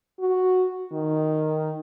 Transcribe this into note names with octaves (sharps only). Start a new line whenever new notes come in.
F#4
D#3